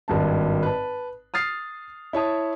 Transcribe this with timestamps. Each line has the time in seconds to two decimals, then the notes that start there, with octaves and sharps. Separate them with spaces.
0.08 G#1 G2 A5
0.63 B4 A5
1.34 D#6 F6 A6 C7
2.13 E4 C#5 A5 D#6